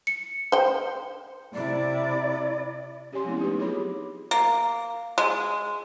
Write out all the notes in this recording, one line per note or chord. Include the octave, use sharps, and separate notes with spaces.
C#7
C5 G5
C3 E4 D5
C#4 G4 C#5 G#5 C6
F3 G#3 A3 B3 C4 E4
D#4 G4 B4
F#3 F4 G#4 C#5 B5 D6
A#3
G#3